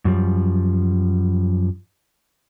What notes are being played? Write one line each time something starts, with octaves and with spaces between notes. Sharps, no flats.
F#2 F3 G3